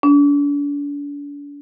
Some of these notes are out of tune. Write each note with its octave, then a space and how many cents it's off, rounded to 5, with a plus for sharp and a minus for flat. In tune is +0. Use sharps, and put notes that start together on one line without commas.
D4 -40